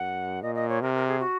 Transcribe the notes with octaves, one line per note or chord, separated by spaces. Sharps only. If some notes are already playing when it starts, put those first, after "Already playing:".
Already playing: F#2 F#5
A#2 D#5
D#5
C#5
C3 A#4
A#4
G#4
F#4